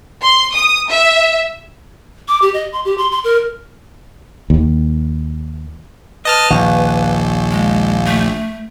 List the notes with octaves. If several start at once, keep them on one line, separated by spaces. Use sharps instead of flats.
C6
D#6
E5
D6
G4
D#5
C6
G4
C6
C6
A#4
D#2
B4 D#5 A5 F6
A#1 D#2
G#3
A3